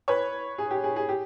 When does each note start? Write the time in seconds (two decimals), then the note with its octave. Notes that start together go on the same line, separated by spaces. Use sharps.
0.08 B4 C#5
0.58 G#4
0.71 G4
0.84 G#4
0.96 G#4
1.09 G4